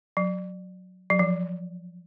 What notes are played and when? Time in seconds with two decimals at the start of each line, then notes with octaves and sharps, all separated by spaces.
0.17 F#3
1.10 F#3
1.19 F3